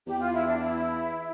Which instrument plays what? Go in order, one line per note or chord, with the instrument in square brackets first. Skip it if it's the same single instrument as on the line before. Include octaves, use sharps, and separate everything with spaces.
[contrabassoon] E2 [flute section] G4
[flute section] F4
E4
D4
E4